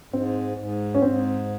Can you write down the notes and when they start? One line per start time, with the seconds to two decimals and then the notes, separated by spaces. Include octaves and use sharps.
0.12 G#2 C4
0.58 G#2
0.95 C#4
1.02 G#2 C4